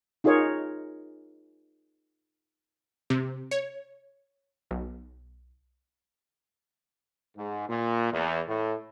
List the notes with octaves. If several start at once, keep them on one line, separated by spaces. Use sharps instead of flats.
D#4 F4 G#4 A#4 C#5
C3
C#5
B1
G#2
A#2
E2
A2